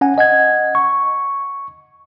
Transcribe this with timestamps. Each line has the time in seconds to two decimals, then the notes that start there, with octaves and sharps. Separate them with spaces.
0.01 C#4 F#5 G#5
0.18 D#5 F#5 G#6
0.75 C#6